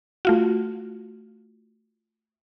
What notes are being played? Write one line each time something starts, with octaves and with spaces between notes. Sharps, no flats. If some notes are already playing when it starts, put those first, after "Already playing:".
A3 F4 F#4